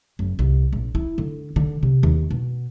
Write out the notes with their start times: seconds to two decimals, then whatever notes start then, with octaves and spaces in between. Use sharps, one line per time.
0.19 F#1
0.39 C2
0.73 A#1
0.95 E4
1.18 D3
1.56 D3
1.83 C3
2.03 D#2
2.31 B2